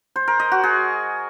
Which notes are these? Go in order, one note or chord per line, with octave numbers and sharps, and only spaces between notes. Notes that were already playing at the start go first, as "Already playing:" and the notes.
C5
A#4
D#5
F#4
G#4